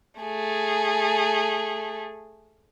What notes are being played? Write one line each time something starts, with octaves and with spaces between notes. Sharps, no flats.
A3 G#4